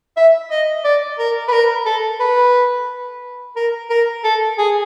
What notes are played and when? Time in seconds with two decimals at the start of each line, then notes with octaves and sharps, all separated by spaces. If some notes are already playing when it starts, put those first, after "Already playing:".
0.17 E5
0.51 D#5
0.84 D5
1.19 A#4
1.48 B4
1.52 A#4
1.86 A4
2.20 B4
3.56 A#4
3.90 A#4
4.24 A4
4.58 G#4